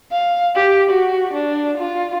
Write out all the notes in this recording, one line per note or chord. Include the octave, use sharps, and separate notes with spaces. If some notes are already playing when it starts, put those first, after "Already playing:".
F5
G4
F#4
D4
F4